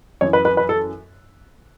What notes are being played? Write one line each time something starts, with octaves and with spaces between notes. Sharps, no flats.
F#2 E3 C#5
B4
B4
B4
A4